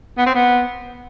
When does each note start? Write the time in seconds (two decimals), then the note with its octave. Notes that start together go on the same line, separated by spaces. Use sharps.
0.18 B3
0.26 C4
0.35 B3